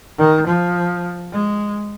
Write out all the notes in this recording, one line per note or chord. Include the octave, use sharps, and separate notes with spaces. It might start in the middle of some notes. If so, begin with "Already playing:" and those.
D#3
F3
G#3